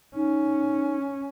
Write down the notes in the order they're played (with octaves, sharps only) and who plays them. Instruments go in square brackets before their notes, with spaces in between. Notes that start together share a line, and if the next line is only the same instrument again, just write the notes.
[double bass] C#4 [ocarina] D#4